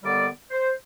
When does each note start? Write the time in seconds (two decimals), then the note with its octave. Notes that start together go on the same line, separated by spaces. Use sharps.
0.02 D#2 D3 G3 B3 D5
0.50 C5